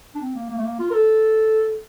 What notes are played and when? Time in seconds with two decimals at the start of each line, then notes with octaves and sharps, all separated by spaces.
0.15 D4
0.21 C4
0.35 A#3
0.50 A#3
0.58 A3
0.65 A#3
0.79 F4
0.90 A#4
0.94 A4